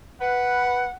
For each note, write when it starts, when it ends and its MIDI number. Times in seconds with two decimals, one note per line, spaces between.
0.21 0.87 71
0.21 0.96 78